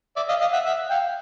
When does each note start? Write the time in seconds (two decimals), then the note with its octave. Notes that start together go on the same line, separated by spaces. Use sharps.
0.16 D5 E5
0.29 D#5 F5
0.41 D#5 F5
0.53 E5 F#5
0.65 E5 F#5
0.90 F5 G5